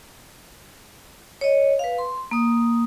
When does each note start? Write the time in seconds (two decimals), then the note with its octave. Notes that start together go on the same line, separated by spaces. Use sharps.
1.41 C#5 D#5
1.79 B4 F5
1.98 C6
2.31 A#3 D#6